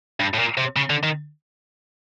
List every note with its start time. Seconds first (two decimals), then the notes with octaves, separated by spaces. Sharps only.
0.20 G2
0.34 A2
0.39 A#2
0.57 C3
0.76 C#3
0.90 D3
1.03 D#3